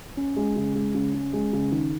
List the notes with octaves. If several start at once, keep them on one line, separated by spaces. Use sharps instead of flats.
C#4
G#3
C#3
G#3
C#3
C#4
G#3
C#3
D#3